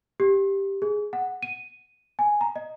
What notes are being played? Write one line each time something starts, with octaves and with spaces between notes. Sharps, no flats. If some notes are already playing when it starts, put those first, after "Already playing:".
G4
G#4
F#5
D#7
G#5
A#5
D#5